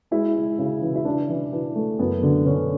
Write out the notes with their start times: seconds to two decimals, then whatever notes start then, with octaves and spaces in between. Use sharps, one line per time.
0.11 G#3 E4
0.35 G#3
0.59 C#3
0.82 E3
0.95 E4
1.05 C#3 D4
1.29 E3
1.52 E3
1.75 A3
1.99 F#2 B3
2.23 D3
2.46 D3 C#4